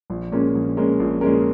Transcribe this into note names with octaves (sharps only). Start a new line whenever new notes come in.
A#1
A#2 G#3 C#4 A#4
A#1
A#2 G#3 C#4 A#4
A#1
A#2 G#3 C#4 A#4